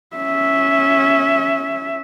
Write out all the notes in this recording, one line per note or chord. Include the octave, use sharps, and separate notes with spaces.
C#4 E5